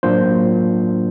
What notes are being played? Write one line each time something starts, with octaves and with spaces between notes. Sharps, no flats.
A2 F#3 A#3 D4 F4 C5